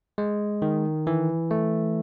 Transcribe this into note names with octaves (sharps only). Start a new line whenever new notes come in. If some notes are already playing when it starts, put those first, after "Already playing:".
G#3
D#3
E3
A3